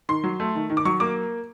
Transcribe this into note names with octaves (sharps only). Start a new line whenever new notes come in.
D#3 C6
F#3
A3
D#3
D#3
D6
F#3 C#6
A#3 D6